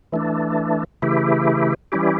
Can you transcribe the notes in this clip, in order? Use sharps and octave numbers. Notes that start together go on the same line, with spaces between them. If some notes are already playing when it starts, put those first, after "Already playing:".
E3 A3 D4
C#3 E3 A3 E4 G4
E3 G3 C#4 E4 G4